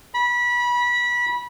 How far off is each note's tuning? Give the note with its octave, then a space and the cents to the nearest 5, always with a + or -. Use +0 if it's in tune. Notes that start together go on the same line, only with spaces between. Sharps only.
B5 -25